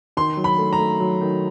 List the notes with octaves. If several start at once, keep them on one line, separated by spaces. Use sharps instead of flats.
D#3 C6
F#3
B5
A3
A#5
A3
F#3
D#3